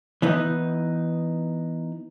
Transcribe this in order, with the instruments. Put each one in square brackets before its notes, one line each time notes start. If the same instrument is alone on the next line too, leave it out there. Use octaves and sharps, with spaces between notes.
[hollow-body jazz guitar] E3 B3 D#4